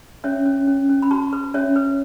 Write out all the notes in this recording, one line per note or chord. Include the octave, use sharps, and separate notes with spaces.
C#4 C#5 E5
C#4
C#4
C#4
B5
F#4 A5 C#6
B4
C#4 C#5 E5
B4